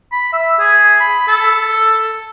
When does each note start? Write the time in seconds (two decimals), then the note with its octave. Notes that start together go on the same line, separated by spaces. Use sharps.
0.12 B5
0.33 E5
0.59 G#4
1.00 B5
1.27 A4